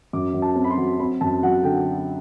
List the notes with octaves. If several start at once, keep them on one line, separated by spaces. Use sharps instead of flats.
F#2 D6
F#2
A5
C4
B5
C6
F#3
C4 B5
F#2 A5
F#3 F#5
D3 G5